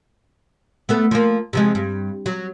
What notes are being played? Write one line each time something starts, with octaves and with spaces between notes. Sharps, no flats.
A3 B3 A4
F3 A#3
C3 F3 G#3
G2
F#3